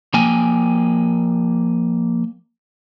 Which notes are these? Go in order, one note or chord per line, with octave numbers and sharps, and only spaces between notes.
F3 A#3 G5 G#5